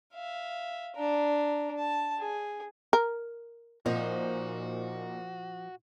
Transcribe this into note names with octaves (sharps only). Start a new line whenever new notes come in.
E5 F5
D4 A#5
A5
G#4
A#4
A#2 F3 D#4 F#4 C5